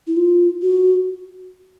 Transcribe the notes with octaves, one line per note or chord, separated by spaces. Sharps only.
E4
F4
F#4